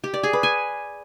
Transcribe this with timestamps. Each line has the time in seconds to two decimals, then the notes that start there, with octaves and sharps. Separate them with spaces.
0.04 G4
0.14 D5
0.23 G#4
0.33 B4
0.43 G#5